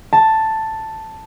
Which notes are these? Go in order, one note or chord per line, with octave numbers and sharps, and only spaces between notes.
A5